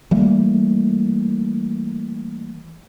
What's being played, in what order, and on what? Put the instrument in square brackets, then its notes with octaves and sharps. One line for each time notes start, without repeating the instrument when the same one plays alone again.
[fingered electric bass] E3 G3 A3 A#3